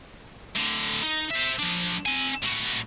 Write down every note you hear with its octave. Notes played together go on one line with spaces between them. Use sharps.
A2 D3
D#4
C5 E5
F3 D4
C4 G#5
A2 F#4